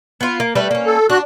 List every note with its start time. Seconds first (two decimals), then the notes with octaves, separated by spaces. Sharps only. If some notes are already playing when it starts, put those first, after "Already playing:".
0.21 B3 F4
0.40 A#3
0.55 G3 A3 B4
0.71 A#3 C#4
0.86 A4
1.10 D4 F#4 F#6